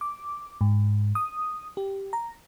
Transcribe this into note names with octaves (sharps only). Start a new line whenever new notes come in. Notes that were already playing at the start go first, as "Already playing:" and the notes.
D6
G#2
D#6
G4
A#5